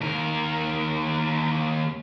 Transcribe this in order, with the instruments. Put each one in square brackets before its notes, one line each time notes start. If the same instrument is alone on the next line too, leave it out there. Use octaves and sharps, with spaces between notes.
[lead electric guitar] D#2 A#4